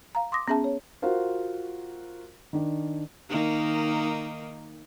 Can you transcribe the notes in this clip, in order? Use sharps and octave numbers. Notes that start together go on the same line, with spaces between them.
F5 A#5
C6 D6 D#6 A#6
B3 C#4 G#4 E5 A5
C#5
F4 F#4 A#4 C5 F5
D#3 D4
D#3 A#3 D#4